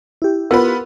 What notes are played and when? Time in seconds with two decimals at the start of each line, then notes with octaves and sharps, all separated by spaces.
0.22 E4 G4
0.51 B3 F4 A#4 B4